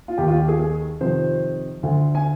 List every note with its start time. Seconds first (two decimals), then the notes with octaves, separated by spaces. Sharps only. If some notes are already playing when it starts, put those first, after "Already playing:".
0.08 F4
0.18 D#2 D#3 G4
0.28 F4
0.39 G4
0.48 G#4
0.59 G#4
1.01 F2 C3 D#3 C5
1.83 D2 D3
2.15 G#5